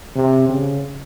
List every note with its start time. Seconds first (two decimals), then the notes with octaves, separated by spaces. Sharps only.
0.16 C3
0.49 C#3